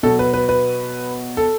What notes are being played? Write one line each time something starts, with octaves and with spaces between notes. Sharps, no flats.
B2 F#3 A4
B4
B4
B4
A4